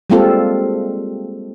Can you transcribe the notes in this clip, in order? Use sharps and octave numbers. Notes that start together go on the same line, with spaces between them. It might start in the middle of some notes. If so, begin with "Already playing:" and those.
G3 G#3 A#3 C4 F4 A4